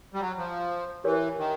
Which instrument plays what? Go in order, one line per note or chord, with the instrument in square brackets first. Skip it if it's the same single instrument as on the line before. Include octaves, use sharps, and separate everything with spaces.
[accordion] G3
F#3
F3
[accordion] E3 [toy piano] G4 A#4 C#5
[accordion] D#3